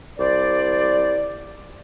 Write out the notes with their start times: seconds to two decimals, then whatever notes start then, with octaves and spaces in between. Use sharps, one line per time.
0.19 C2 C5 D5